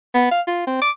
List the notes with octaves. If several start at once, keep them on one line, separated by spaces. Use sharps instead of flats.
B3
F5
F4
C4
D6